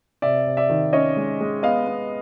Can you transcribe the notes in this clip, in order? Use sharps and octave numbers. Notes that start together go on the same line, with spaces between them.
C3 D5 E5
C3
D5 E5
D#3
C#4 C#5 D#5
G#3
G#3
B3 D#5 F5
B3